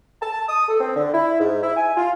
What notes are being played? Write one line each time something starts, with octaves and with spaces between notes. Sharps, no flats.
A5
D#6
A4
C4
D3
E4
G#2
E4
G#5
F4